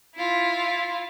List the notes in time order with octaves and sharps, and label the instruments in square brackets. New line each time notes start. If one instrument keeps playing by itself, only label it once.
[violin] E4 F4